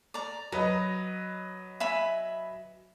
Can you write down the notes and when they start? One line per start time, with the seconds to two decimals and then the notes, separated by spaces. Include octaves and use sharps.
0.14 D5 A#5
0.52 F#3 B4 D#5 A#5
1.80 E5 G#5 B5